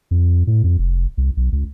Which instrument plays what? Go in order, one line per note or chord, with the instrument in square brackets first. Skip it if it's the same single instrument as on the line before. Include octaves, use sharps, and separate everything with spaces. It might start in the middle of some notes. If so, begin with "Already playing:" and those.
[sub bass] F2
A2
F2
F1
C2
B1
C#2